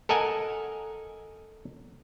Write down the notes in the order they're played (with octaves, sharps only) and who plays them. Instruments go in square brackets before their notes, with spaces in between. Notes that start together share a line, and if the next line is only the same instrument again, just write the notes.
[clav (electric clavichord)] A4 A#4 D#5 F#5 G#5